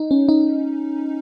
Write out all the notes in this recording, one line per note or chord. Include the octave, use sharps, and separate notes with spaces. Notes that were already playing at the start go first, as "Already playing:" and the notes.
Already playing: D#4
C#4
D#4